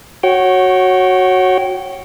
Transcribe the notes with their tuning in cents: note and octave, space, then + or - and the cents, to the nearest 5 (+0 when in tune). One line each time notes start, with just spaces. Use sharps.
F#4 +0 C#5 -15 G5 -25